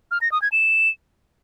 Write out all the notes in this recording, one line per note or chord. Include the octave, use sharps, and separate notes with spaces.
F6
A#6
D#6
G#6
E7